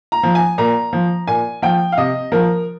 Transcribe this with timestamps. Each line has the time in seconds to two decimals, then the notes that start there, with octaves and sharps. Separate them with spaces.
0.12 A#5
0.23 F3
0.35 G#5
0.58 A#2 A#5
0.93 F3
1.27 A#2 G#5
1.62 F3 G5
1.92 F5
1.97 C3 D#5
2.32 F3 A#4